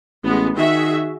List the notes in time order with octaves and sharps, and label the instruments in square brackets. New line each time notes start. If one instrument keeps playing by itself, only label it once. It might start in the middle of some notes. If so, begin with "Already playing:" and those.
[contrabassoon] A1 [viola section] G#3 B3
[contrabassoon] D#3 [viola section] F#4 G#4 E5